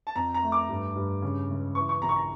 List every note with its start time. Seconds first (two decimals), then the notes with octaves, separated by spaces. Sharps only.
0.07 A5
0.15 F2 A#5
0.34 A#5
0.43 A3
0.52 D6
0.69 G2
0.95 G2
1.22 C#3
1.49 C#2
1.75 E3 C#6
1.89 C#6
2.02 A#1 A#5
2.09 C#6
2.16 A#5